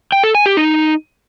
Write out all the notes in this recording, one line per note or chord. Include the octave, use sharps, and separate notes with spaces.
G5
A4
G#5
G4
D#4